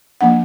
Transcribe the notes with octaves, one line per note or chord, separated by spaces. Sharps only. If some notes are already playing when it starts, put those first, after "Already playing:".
F3 A#3 D4 F#5